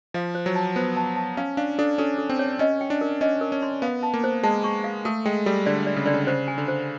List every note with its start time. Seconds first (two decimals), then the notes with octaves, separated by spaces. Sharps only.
0.14 F3 F5
0.35 C5
0.46 F#3
0.55 A5
0.76 B3 C5
0.97 A5
1.16 A5
1.37 C#4 F5
1.57 D4 F5
1.78 D4 A4
1.98 C#4 A4
2.18 A4
2.29 C4
2.39 C#5
2.59 C#4 D#5
2.81 G5
2.90 D4
3.01 A#4
3.21 C#4 D#5
3.41 A#4
3.52 C#4
3.62 C6
3.82 B3 F5
4.03 A5
4.14 A#3
4.24 C5
4.43 G#3 A5
4.64 C#6
4.84 F5
5.05 A3 A4
5.26 G#3 G5
5.46 G3 A4
5.66 D3 D5
5.87 D5
5.96 C#3
6.06 D3 D5
6.14 C#3
6.27 C#3 C5
6.48 G#5
6.58 D3
6.68 C5